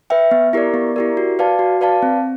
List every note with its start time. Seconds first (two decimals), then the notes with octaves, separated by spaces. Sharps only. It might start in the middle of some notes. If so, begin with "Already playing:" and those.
0.10 B4 E5 G5
0.31 B3
0.53 E4 G4 A#4 D5
0.74 B3
0.96 E4 G4 A#4 D5
1.17 F#4
1.39 B4 D5 F5 A5
1.59 F#4
1.81 B4 D5 F5 A5
2.02 C4